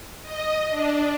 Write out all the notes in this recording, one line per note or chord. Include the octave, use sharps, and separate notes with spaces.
D#5
D4